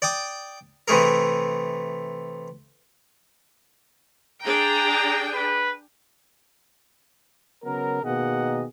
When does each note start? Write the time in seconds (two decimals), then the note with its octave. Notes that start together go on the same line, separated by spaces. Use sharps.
0.02 D5 G5 D6 D#6
0.88 C3 E3 A3 G#4 A#4
4.43 D4 G#4 G5 A#5
5.34 B4
7.64 C#3 F#3 B3 A#4
8.03 B2 D#3 A#3 G#4 D#5 F#5